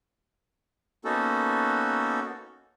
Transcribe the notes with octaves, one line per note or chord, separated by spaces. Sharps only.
A#3 B3 C#4 D#4 F#4 A4